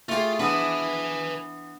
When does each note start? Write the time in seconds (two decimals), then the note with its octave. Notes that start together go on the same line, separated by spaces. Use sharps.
0.09 A3 F4 G4 G#4 F5 C6
0.39 E3 B3 D4 B4 E5 G#5